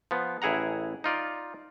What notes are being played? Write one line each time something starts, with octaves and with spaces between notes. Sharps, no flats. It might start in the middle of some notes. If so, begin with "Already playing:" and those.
F3 B3
A1 E4 G#4 F#5 A#5
D#4 F4 D5